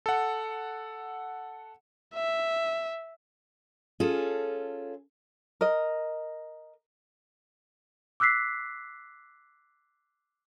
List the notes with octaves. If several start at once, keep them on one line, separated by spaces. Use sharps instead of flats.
A4 F#5
E5
C#4 F4 G#4 A4
A#4 D#5
D6 E6 F#6 B6 C7